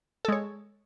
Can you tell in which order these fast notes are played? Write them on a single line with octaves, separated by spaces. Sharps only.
A4 G#3 C#5